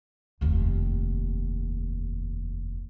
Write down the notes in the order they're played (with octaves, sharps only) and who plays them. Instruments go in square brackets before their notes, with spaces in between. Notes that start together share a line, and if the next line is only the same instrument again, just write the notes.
[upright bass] F1 D#2